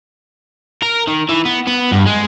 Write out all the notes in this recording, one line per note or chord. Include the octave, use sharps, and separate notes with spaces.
A#4
D#3
E3
B3
B3
G2
G#3